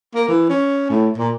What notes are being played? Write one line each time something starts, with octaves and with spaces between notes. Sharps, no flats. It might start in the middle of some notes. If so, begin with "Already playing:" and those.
A#3
E3
C#4
A2
A#2